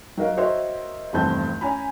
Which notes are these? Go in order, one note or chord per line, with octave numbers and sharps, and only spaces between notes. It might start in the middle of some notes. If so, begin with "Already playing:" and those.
F#3 D#4 A#4 F5
F#4 A#4 C5 C#5 D#5 E5
F1 E2 G2 C4 A5 G6
C#4 C#5 G#5 A#5 B5